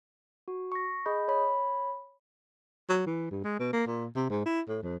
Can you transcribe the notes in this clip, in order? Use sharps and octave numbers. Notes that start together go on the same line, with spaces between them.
F#4
C#6 A#6
G#4 D#5 B5 G6
C#5 B5
F#3
E3
G2
G#3
B2
A#3
A#2
C3
G#2
E4
A2
F2